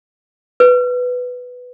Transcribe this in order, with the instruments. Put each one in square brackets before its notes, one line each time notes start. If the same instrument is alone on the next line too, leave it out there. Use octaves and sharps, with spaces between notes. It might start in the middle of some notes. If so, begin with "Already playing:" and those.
[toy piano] B4